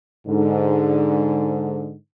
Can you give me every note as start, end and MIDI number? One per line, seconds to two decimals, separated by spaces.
0.28 1.93 44
0.28 1.93 50